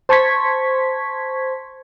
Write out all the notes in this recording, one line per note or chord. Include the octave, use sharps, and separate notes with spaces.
C5 A5 C6 C#6 G#6 B6